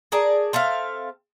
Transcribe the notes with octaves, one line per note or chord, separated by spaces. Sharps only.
G#4 A#4 D5 A5
C4 A4 E5 F5